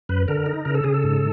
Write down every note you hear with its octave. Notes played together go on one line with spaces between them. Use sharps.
F#2 B4
D3 A#4
D#4
C#3 A#4
A4
C#3 G#4
A4
G#2